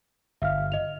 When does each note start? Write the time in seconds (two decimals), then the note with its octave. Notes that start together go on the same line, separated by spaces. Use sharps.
0.42 G1 E5 F5 F6
0.72 D#5 F7